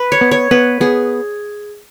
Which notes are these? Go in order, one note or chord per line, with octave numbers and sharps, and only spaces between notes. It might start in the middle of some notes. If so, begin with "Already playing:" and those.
Already playing: B4
C#5
B3
C#5
B3 B4
B3 G#4